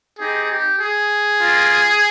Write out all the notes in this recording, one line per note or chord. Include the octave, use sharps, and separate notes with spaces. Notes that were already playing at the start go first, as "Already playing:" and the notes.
C4 D#4 G4 G#4
G4
G#4
A#3 F4